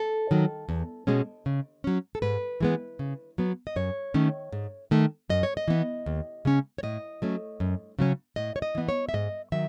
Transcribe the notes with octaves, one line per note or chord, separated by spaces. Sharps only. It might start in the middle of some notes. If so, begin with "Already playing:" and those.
Already playing: A4
D#3 F#3
E2
B2 G#3 C#4
C#3
F#3 C#4
A4
G#2 B4
E3 G#3 B3
C#3
F#3 B3
D#5
F#2 C#5
D#3 A3 C#4
G#2
D#3 A3
F#2 D#5
C#5
D#5
E3 B3
D#2
C#3 G#3 C#4
C#5
A2 D#5
F#3 A3 C#4
F#2
C#3 F#3 C#4
A2 D#5
C#5
D#5
E3 B3
C#5
E5
G#2 D#5
D#3 F#3 E5